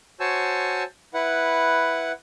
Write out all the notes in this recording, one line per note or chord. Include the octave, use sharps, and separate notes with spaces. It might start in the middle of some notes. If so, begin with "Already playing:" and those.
F#4 C5 C#5 G#5 A5 E6
E4 B4 F#5